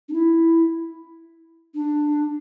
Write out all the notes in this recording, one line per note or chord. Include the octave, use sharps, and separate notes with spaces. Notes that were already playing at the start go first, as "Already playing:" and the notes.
D4
E4
D4